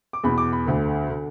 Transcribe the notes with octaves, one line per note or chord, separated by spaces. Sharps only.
D6
E2 B2 B5
D6
B5
D2 D3
D3